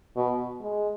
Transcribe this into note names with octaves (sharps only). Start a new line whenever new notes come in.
B2
G#3